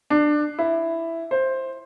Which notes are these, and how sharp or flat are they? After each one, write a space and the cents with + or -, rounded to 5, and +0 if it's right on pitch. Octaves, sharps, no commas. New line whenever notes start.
D4 +20
E4 +5
C5 +10